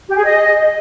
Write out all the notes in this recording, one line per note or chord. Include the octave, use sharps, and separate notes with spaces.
G4
G#4
D#5